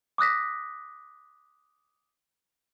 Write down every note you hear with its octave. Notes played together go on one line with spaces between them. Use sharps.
D6 D#6 F#6 A#6 B6